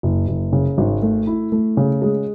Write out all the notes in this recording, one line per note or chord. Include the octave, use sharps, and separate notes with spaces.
F#1
F#1
C#3
G#1
A3
E4
A3
C#3
G#3